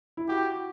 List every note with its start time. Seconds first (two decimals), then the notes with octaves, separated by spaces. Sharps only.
0.17 E4
0.29 F#4 G4